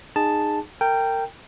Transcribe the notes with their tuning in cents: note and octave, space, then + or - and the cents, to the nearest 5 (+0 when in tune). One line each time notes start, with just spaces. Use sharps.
D#4 -20 G#4 -10 A5 +0
A#4 -30 G5 +0